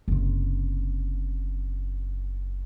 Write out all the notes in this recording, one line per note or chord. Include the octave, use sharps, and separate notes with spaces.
F#1 C3